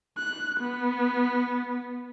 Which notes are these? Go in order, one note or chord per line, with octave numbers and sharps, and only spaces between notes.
F#6
B3